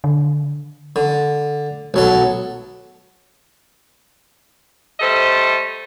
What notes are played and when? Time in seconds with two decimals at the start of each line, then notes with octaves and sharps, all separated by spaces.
0.04 D3
0.96 D3
1.94 B1 F#3 A4
5.00 G3 A3 A4 C5 D#5